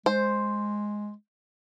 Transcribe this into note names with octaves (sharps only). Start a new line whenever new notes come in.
G#3 C5